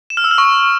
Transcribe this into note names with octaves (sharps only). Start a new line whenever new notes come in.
E7
F6
E6
F6
C#6